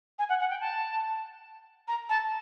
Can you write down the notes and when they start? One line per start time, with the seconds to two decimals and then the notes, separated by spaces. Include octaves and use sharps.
0.19 G#5
0.29 F#5
0.40 F#5
0.50 G5
0.61 A5
1.88 A#5
2.09 A5